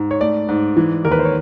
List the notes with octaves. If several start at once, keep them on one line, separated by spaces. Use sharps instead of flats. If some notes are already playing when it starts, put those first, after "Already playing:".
Already playing: G#2
C#5
A3 D5
G#2
E3
D#2 A#4
B4
C5
C#5